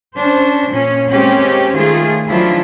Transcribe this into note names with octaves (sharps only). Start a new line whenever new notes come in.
C#4 D4 C5
A#2 C#4
G#3 A#3 C4 C#4 G4
D#3 A3 F4 G#4
D#3 F3 F#3 D4 E4 F4